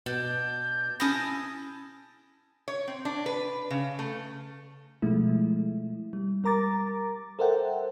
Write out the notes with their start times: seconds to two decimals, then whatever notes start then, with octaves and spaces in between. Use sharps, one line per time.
0.06 B2 D4 G6
1.00 C#4 E4 G#4 A5 D#6 A#6
2.68 C#5
2.88 C4
3.05 D4
3.26 B4
3.71 C#3
3.99 A3
5.02 B2 F3 G#3 A3 E4
6.13 G3
6.44 G3 A#4 A#5 D6 A6
7.39 A4 A#4 C5 E5 F#5 G5